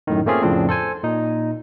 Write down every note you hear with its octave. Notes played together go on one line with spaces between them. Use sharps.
F#2 A2 D#3
A3 A#3 C4 C#4 F4 G#4
F2 A2 C#3 F3 C4 D4
A4 C5 G#5
A#2 D#4